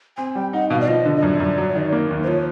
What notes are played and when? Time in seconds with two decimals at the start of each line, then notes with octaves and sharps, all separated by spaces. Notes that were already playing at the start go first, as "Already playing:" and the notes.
0.17 C4 G#5
0.35 G3 G5
0.53 D#4 F#5
0.70 B2 F5
0.81 D5
0.88 F3 D#5
1.05 D3
1.16 D#5
1.22 F#2 D5
1.40 F#2
1.58 F#3
1.75 D#3
1.92 A#3
2.10 D#2
2.23 C5
2.27 F3 C#5